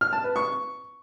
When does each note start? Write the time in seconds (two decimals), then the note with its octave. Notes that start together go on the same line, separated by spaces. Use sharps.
0.01 F6
0.13 A5
0.24 B4
0.36 C#6